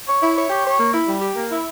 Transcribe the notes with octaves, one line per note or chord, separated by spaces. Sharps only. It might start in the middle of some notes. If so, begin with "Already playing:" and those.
C#5
E4
C#5
G4
C#5
A#3
E4
G3
G4
A#3
E4